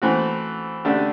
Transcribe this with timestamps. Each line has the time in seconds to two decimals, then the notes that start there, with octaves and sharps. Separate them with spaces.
0.02 E3 A3 C4 F#4
0.85 D3 A3 D4 G4